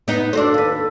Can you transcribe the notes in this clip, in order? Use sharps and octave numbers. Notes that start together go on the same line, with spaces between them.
B3 D#4
D4 F#4 A4 C5
D#2 B4